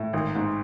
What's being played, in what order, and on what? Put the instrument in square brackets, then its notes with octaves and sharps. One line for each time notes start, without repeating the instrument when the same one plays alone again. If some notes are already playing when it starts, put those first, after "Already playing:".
Already playing: [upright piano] A2
G#1
G#2